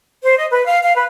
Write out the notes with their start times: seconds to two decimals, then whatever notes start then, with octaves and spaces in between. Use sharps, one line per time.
0.23 C5
0.38 D#5
0.51 B4
0.66 F5
0.83 F5
0.95 B4